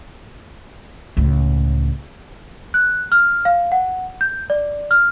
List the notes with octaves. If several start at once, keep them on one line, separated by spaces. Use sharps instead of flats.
C#2 A2
F#6
F6
F5
F#5
G6
D5
F6